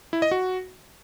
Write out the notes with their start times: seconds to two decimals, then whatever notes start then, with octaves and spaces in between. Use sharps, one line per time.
0.13 E4
0.22 D#5
0.31 F#4